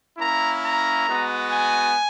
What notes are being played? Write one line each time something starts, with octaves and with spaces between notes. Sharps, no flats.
A#3 C#4 E4 A#5
A#5
G#3 B3 F#4
G#5